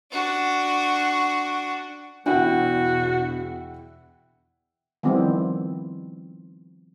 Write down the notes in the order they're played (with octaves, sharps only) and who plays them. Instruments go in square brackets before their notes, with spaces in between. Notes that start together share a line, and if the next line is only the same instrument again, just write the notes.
[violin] D4 F#4
[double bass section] E2 B2 [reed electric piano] D4 [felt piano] E4 F#5 G5 [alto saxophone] F#4
[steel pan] D#3 F3 G3 B3 C4 E4